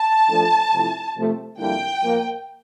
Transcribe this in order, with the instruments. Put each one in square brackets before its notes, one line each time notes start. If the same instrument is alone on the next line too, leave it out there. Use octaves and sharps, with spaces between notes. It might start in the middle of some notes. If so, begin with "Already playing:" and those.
Already playing: [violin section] A5
[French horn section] F3 A3 D4 A4
C3 F3 A3 E4
C3 F3 A3
[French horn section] F2 D3 G3 A#3 E4 [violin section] G5
[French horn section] A#2 F3 A#3